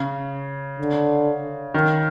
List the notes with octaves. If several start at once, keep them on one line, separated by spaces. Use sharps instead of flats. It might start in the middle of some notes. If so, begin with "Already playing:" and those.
Already playing: C#3
D3
D#3